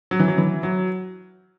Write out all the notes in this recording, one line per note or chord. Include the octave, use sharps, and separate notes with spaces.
F#3
E3
F#3
E3
F#3